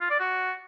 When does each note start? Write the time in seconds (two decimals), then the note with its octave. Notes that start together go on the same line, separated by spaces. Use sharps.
0.01 F4
0.10 D5
0.20 F#4